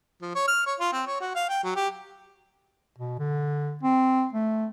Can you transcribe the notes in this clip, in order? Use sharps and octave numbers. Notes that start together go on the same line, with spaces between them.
F3
C#5
F6
C#5
F4
C4
C#5
F#4
F5
G5
F#3
G4
B2
D3
C4
A3